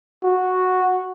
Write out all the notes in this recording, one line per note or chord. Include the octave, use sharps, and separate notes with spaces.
F#4